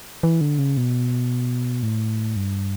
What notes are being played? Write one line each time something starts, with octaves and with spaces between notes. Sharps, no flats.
E3
D3
C#3
B2
A2
G2